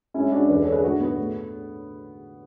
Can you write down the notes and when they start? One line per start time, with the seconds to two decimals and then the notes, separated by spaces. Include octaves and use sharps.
0.14 G#3 C#4 E4
0.32 G#3 D4 F#4
0.49 E2 B4 D5
0.61 A4 C#5
0.66 D3
0.72 G#4 B4
0.83 A2 D4 F#4
1.00 A3 B3
1.18 A3